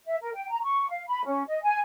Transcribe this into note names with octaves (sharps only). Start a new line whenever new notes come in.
E5
A#4
G5
A#5
C#6
F5
B5
C#4
D#5
G#5